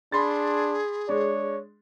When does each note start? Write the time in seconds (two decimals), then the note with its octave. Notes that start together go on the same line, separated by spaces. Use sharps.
0.12 D4 G#4 B5 C6 A6
1.09 G#3 D4 C#5